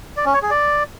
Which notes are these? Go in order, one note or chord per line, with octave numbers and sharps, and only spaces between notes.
D5
C#4
C#5
G#4
D5